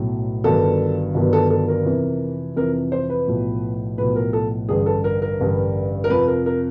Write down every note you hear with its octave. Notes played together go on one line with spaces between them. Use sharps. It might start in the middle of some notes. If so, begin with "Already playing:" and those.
Already playing: B1 A2 F#3
G1 G2 D#3 F#3 A4
G1 G2 D#3 F#3
A4
A4
A#4
F2 C3 E3
F2 C3 E3 A#4
C5
B4
B1 A2 F3
B1 A2 F3 B4
A#4
A4
A1 G2 D3 G3 G#4
A4
A#4
A#4
A1 G2 D3 G3
A#4
F2 C3 F3 B4
A#4
A#4